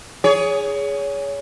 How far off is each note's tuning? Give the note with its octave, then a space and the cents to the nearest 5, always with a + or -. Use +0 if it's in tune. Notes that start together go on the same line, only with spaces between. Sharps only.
G#4 +0 C#5 +25